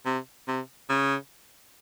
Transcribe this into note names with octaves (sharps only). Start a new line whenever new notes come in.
C3
C3
C#3